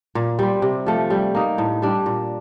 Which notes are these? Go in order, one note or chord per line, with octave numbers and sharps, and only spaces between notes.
A#2
G3 C4
C3
F3 A3
G3
A#3 D#4
A2
G3 D4
A#2